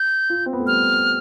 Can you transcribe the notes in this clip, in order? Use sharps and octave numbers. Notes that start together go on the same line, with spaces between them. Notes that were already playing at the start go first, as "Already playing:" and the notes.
Already playing: G6
F4
C4
B3
A3
G3 F6